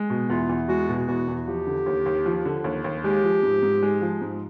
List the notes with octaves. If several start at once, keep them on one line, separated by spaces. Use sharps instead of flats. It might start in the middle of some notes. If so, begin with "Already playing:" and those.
Already playing: G#3
B2
E2 F4
E2
G#3 F#4
B2
E2 F#4
E2
F3 G4
D3
D#2
D#2
F3
D3
D#2
D#2
G#3 G4
F3
G#2
G#2
G#3
F3
G#2